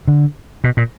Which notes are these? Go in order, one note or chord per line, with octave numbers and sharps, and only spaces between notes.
D3
B2
A#2